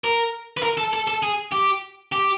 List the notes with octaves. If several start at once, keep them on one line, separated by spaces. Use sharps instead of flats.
A#4
B4
A#4
A4
A4
A4
G#4
G4
G4